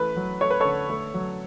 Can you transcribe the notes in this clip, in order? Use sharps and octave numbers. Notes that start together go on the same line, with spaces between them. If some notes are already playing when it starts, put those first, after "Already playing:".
Already playing: E3 A3 B4
F#3
A3 C#5
B4
D3 A4 C#5
A3
F#3